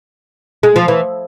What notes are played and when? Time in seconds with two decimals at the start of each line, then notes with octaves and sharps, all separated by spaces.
0.63 G#3
0.76 F3
0.88 E3